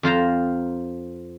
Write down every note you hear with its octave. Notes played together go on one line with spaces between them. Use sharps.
F2 F4 C5 A#5